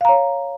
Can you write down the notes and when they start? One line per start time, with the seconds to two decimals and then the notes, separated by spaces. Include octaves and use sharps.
0.01 F5
0.05 A#5
0.09 C#5